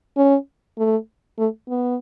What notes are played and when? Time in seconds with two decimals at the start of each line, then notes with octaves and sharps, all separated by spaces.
0.17 C#4
0.78 A3
1.38 A3
1.69 B3